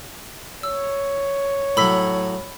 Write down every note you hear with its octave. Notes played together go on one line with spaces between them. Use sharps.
C#5 E6
A2 F#3 B5 E6 B6